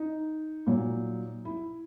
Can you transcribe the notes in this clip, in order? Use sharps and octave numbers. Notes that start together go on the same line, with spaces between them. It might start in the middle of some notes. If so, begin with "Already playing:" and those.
Already playing: D#4
A#2 F#3
E4